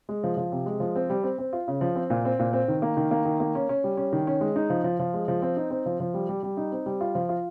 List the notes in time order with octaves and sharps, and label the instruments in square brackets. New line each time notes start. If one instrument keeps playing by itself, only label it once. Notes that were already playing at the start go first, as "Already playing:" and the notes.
[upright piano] G#3
F3
F3
C3
G#3
F3
C4
G3
C4
C4
F4
C#3
F3
C4
A#2
C4
A#2
C4
D#3
A#3
D#3
A#3
D#3
A#3
C#4
C#4
G3
C#4
D#3
C#4
G#3
D#4
F3
F3
F3
G#3
F3
C4
D#4
C4
F3
F3
G3
G3
G3
D#4
C4
G3
F4
F3
F4